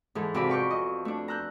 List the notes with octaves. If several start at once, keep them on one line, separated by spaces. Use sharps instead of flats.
G#2 E3 A4
F2 C3 F4 F#4 D5 B5
B4 C#6 D6 G6
D#5
A3 D4
A#5 E6 F#6 G6